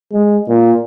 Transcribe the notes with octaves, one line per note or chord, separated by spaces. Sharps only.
G#3
A#2